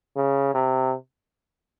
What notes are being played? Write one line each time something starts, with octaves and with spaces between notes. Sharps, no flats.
C#3
C3